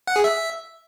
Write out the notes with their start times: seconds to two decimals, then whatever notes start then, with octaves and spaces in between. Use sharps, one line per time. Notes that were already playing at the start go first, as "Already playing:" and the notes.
0.07 F#5
0.16 G#4
0.24 E5